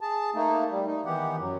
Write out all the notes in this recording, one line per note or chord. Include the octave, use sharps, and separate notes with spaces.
G#4 A5
A3 A#3 D#4
G3
D#4
D#3 E3 B3 G4 F#5
F#2 F#3